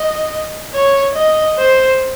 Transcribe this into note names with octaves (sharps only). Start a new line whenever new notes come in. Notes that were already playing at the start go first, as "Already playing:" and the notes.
Already playing: D#5
C#5
D#5
C5